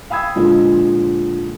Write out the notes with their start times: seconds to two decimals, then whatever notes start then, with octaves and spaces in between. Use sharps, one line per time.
0.10 F5 G5 B5 D#6 E6 G#6
0.36 A#2 D3 F3 G#3